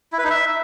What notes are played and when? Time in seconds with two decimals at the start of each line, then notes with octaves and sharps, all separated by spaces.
0.12 E4
0.18 B4
0.24 D#4
0.30 E5